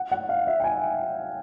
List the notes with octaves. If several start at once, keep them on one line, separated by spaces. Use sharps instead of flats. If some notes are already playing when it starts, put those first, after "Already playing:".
Already playing: F#5
F#5
F5
E5
G5
G#5